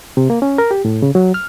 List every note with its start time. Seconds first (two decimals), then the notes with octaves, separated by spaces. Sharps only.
0.17 C3
0.30 A#3
0.42 C#4
0.58 A#4
0.71 G4
0.85 A2
1.02 C#3
1.15 F#3
1.34 F6